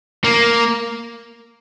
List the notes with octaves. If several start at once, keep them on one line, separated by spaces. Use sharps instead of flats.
A#3